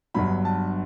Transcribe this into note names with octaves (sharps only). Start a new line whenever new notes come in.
G1 G2 F#3 B5
A5